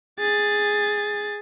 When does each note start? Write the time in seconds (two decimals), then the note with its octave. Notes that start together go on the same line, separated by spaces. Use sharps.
0.19 G#4 A6